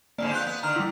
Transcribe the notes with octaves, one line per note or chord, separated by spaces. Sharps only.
F2 G#2 D3 A#3 D5
F2 B3 F4 F#6 G6
B3
D3 D#3 A#5 F6
G3 E4